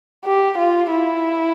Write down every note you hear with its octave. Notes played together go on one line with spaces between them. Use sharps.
G4
F4
E4